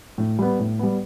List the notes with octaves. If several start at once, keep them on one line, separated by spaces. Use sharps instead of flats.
A2
G3 B3
A2
G3 B3